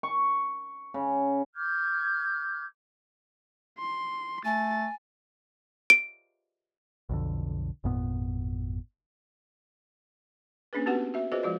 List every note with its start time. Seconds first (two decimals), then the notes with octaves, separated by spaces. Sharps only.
0.03 C#6
0.94 C#3
1.55 D6 F6 G6 G#6
3.79 C6
4.45 A3 G#5 A6
5.90 D7
7.09 B1 F2 D3
7.84 G#1 F2 A#2 B3
10.73 A#3 C#4 D4 G#4 B4
10.86 B3 C4 F#4 G4 B4 F#5
11.14 F#4 E5
11.32 F4 F#4 G#4 B4 C5 D#5
11.43 F3 G#3 F4 F#4 D5